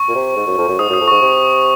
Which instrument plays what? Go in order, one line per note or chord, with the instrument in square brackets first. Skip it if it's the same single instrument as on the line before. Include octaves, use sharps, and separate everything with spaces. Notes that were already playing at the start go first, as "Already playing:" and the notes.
Already playing: [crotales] C#6
[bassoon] A#2
C3
G#2
F#2
F2
F#2
[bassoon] G#2 [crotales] D#6
[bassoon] F#2 [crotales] D#6
[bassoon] F2
[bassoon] G#2 [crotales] C#6
[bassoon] C3